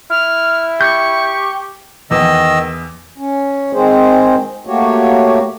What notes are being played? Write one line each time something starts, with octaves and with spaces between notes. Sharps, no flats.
E4 F6
G4 C#6 G6
E2 D#3 D#5 E6
C#4
D#3 G#3 C4 G#4 C5
A3 A#3 F#4 G4 C#5